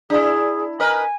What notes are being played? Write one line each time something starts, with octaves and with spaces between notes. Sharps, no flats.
D4 E4 G#4
A#4 B4 D#5 G#5